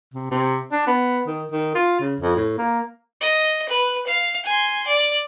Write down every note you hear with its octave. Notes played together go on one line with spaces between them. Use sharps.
C3
C3
D4
B3
D#3
D#3
F4
C#3
F2
A2
A#3
D#5
B4
F5
G#5 C6
D5